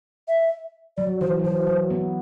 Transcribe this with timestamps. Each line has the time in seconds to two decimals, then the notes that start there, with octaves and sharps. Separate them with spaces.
0.28 E5
0.97 F#3 D5
1.21 E3 C5
1.39 F#3
1.44 E3 C5
1.67 F#3
1.90 B3